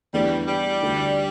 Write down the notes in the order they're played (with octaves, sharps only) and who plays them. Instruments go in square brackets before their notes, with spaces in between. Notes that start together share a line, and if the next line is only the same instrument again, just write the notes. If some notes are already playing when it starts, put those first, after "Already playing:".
[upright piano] E2 E3 A3 D4 [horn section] G3
[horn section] G3
[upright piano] D2 D3 A3